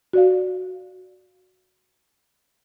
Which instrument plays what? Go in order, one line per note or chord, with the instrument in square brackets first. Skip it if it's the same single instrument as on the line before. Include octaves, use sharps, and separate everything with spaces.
[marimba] F#4 D5 F5